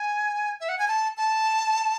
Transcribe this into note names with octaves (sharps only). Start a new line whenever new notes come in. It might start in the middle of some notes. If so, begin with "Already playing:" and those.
Already playing: G#5
E5
F#5
G#5
A5
A5